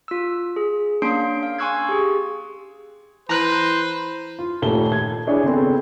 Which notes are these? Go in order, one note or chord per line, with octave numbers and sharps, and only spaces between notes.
F4 E6
G#4
A#3 C#4 D4 C6 C7 D7
F5
G#5 C6 C#6 E6 F#6 G#6
G4 G#4
E3 B4 C5 A#5 F#6
F4
D#1 D#2 A3 G7
G#6
D4 E4 G#4 C#5
C#3 B3 C4 A4